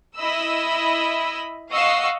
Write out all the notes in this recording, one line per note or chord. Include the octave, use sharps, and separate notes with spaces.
E4 D#5 B5 E6
D#5 F5 F#5 C#6 E6 C7